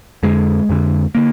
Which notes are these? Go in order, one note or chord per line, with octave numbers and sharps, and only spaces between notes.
F2 D3 G#3
F2 D3
D3 A#3